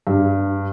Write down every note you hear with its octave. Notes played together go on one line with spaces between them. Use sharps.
G2